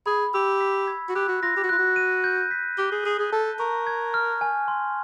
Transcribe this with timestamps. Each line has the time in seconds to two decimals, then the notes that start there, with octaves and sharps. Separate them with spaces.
0.06 G#4 B5
0.34 G4 E6
0.61 B6
0.87 G#6
1.09 F#4
1.15 G4 F#6
1.28 F#4
1.42 F4 A#6
1.56 G4
1.63 F#4
1.69 F4 F#6
1.78 F#4
1.96 D#7
2.24 G6
2.51 B6
2.78 G4 G7
2.92 G#4
3.05 G#4 D#7
3.19 G#4
3.32 A4 A5
3.60 A#4 C#6
3.87 G#6
4.14 F6
4.41 G#5
4.68 C6